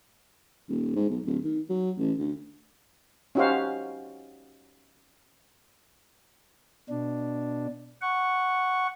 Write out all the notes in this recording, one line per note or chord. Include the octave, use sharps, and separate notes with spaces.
D#1
G#2
B1
D1
D#3
F#3
A1
D2
C#4 D#4 F#4 G4 C5 F5
B2 D4
F#5 C#6